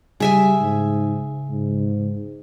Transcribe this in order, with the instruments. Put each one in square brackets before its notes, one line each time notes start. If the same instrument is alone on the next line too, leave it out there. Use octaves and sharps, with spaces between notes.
[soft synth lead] C#3 [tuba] G3 [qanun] G#4 E5 G#5
[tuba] G#2
G#2